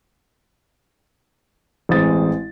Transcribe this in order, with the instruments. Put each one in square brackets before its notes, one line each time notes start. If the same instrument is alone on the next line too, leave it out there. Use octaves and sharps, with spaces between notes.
[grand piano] A1 G#3 C4 D#6 A6